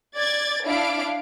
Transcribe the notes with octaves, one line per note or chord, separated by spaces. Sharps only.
D5 G#6 A6
D4 E4 F5 D7